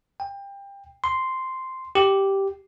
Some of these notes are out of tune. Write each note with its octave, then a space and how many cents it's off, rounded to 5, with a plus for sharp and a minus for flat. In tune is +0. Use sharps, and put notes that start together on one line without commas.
G5 +25
C6 -5
G4 -5